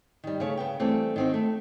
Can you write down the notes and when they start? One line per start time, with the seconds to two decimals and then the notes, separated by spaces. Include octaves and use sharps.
0.24 D#3 G3
0.40 C#3 A3 C#5
0.57 C#3 B3 G5
0.80 E3 G3 A3 C4
1.16 D#3 C4 F#4
1.34 A3